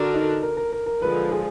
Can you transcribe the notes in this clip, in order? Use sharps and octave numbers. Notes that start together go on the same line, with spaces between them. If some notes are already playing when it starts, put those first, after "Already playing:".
Already playing: D3 D4 F#4 A#4
D#4
A#4
A#4
A#4
A#4
D3 F3 G#3 B4
G#4